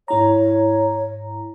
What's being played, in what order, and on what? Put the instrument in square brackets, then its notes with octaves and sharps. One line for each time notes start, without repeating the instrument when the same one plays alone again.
[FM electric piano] G#2 E4 A#5 [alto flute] C#5